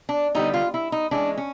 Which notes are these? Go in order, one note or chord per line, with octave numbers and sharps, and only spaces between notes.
D4
D3 G3 B3 D#4
F4
E4
D#4
E3 G#3 C#4 D4
C#4